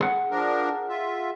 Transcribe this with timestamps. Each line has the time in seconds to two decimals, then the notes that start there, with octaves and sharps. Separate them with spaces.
0.01 G#4 F#5
0.31 F3 D4 A#4
0.89 F4 E5